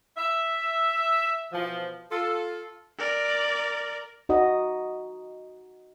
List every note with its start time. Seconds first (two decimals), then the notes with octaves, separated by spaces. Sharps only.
0.17 E5
1.52 B2 E3 F3
2.12 F4 A4
2.98 A#4 D5
4.29 D#4 F#4 D#5